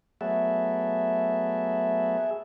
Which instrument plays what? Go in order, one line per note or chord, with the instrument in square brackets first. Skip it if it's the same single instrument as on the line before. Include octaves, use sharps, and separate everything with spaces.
[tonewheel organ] F#3 A3 B3 [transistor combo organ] G#4 E5